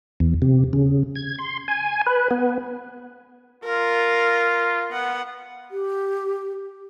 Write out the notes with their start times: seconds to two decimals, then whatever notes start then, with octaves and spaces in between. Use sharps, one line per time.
0.20 E2
0.42 C3
0.73 C#3
1.15 G#6
1.38 C6
1.68 G#5
2.07 B4
2.31 B3
3.64 F4 A#4
4.93 B3 F#5
5.71 G4